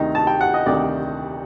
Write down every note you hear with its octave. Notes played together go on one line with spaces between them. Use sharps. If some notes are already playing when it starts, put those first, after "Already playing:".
Already playing: D2 C3 D#3 D#4
A5
G5
F#5
D#5
D2 C3 D#3 D5